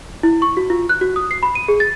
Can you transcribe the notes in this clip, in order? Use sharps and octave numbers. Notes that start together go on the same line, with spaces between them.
E4
C#6
F#4
F4
F#6
F#4
D#6
C7
B5
D#7
G#4
A6